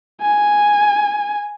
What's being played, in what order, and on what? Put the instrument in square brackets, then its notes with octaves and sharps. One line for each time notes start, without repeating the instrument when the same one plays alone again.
[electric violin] G#5